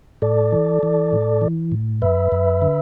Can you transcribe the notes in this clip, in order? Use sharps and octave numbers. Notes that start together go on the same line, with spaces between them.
A2 A4 D5
E3
E3
A2
E3
A2
F#2 B4 E5
F#2
D3